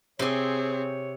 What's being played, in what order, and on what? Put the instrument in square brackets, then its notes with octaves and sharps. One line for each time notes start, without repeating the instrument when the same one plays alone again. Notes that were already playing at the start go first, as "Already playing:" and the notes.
[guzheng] C3 G#5 [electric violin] C4 G#4 [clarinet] C#5